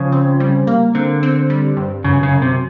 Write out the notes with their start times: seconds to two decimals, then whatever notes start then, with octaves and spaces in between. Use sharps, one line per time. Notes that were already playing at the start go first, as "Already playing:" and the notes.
Already playing: C#3 F3
0.12 C4
0.40 G3
0.67 A#3
0.95 D3 C4
1.23 C4
1.50 G3
1.77 G2
2.04 F#2 C#3
2.23 C#3
2.32 F#2
2.42 C3